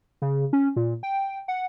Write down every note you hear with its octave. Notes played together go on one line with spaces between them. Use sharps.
C#3
C#4
A#2
G5
F#5